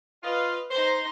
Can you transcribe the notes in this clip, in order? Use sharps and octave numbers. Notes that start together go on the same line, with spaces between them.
F4 B4 D#5 F5
D#4 C5 C6